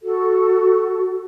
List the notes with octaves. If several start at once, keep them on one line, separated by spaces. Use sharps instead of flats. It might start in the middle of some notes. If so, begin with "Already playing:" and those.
F#4 A4